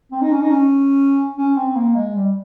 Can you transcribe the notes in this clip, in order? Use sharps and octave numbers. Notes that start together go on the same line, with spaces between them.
C4
D#4
C#4
D#4
C#4
C#4
C4
A#3
G#3
G3